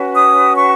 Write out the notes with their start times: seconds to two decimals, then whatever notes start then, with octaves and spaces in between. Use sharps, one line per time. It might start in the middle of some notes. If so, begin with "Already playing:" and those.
Already playing: C#4 F#4 B4
0.16 D#6
0.55 C#6